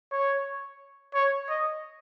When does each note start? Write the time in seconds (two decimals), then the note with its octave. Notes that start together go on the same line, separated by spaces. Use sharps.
0.12 C#5
1.14 C#5
1.49 D#5